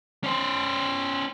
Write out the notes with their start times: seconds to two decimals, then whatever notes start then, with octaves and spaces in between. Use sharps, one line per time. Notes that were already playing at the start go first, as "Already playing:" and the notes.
0.24 C#4 C5